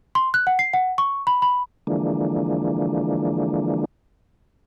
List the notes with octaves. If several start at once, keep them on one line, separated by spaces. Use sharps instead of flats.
C6
F#6
F#5
C7
F#5
C#6
B5
B5
D3 E3 F3 G#3 A#3 D4